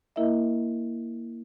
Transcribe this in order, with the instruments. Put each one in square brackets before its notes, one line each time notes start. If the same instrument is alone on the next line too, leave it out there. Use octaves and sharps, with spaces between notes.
[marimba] A#3 E4 A#4 D#5 E5